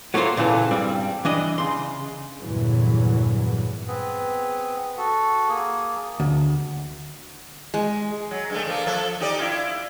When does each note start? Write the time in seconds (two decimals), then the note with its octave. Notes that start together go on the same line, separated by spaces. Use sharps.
0.14 F#3 A3 A#3 F4 C5
0.37 A#2 C#3 E3 A4
0.71 G2 G3 C4
1.25 E3 D4 D#5
1.58 C#3 C6
2.41 E2 G2 A#2 D3 E3 F#3
3.88 B3 C4 G#4 B4
4.97 F#4 A4
5.49 A#3 G#4
6.20 D2
7.74 G#3
8.31 F#3
8.50 G2 G#3 A3
8.67 F3 A#3
8.87 F3 A4 E5
9.20 D#4 G4 D5
9.39 E4 F4